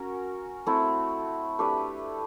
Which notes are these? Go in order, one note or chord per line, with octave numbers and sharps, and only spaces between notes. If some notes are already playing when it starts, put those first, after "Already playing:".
Already playing: C#4 F#4 A#4
A3 C4 E4
A3 D4 G4 B4